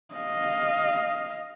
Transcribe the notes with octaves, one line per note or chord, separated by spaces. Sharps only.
D#5 F5